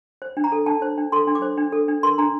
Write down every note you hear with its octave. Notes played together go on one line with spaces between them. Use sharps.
C5
D4
A#5
A4
D4 A5
C5
D4
A4 C6
D4
D6
C5
D4
A4
D4
A#4 C6
D4 A#5